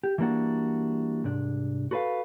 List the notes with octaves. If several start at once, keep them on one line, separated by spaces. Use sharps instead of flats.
G4
E3 G3 A#3 D4 F#4
C2 G#2 D4
F#4 A4 B4 C5 F5